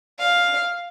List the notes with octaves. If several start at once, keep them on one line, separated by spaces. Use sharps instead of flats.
F5